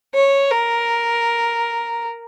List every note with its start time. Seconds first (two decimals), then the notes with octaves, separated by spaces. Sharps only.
0.15 C#5
0.51 A#4